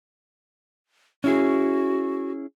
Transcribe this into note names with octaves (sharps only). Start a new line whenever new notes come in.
C#4 E4 F#4 G#4